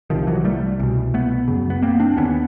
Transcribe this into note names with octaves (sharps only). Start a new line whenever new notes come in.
C2 C3 D#3 F3
E3 F#3
G3 A3
C2 B2
A3 B3
F#2 C#3
B3
A#3 C4
C4 D4
D#2 D3 B3 C#4